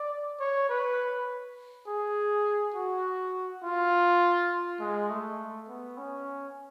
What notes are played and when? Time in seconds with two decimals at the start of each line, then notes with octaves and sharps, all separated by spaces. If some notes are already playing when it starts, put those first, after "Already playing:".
Already playing: D5
0.40 C#5
0.69 B4
1.87 G#4
2.74 F#4
3.63 F4
4.80 G#3
5.10 A3
5.68 B3
5.98 C#4